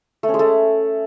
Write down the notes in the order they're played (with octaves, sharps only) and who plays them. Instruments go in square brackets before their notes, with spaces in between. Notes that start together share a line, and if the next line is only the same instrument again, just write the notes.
[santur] A3
C#4
G#3
A3